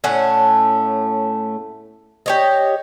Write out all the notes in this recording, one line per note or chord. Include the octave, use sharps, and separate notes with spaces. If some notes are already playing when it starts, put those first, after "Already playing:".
A2 A3 C#4 F#5
G4 C#5 D#5